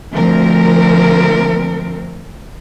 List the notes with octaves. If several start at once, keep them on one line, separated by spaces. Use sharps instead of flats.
D2 F3 C4 A#4